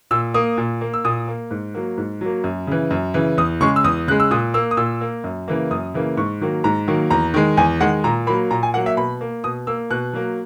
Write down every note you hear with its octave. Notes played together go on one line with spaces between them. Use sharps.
A#2 E6
A#3 D#6
A#2
A#3
E6
A#2 D#6
A#3
G#2
F#3 A#3
G#2
F#3 A#3
F#2
C#3 E3
F#2
C#3 E3
E2 D#6
C#3 G#3 C#6
E6
E2 D#6
C#3 G#3 F#6
E6
A#2 D#6
A#3 E6
D#6
A#2 E6
A#3
F#2
C#3 E3 A#3
F#2 D#6
C#3 E3 A#3
G#2 C#6
D#3 F#3 A#3
G#2 A#5
D#3 F#3 A#3
E2 A#5
D#3 G#3
E2 G#5
D#3 G#3 F#5
A#2 A#5
F#3 A#3 B5
A#2 A#5
G#5
F#3 A#3 F#5
E5
B2 B5
A#3
B2 D#6
A#3 E6
B2 F#6
F#3 A#3